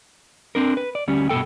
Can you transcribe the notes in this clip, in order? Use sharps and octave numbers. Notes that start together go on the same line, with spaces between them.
C4 D4 A#4
B4
D5
D2 G3 C#4
G2 B2 G#3 A4 G5